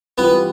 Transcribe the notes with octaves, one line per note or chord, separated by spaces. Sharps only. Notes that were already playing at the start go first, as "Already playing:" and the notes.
E3 G3 B3 C4 F4